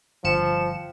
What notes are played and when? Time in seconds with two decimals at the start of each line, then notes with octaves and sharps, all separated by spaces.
0.24 G1 F3 C5 F5 G5 C#7 E7